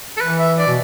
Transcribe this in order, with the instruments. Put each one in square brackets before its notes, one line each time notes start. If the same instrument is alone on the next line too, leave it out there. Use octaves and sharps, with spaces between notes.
[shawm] A4
[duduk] E3 [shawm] B4
[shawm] E5
D5
[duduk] B2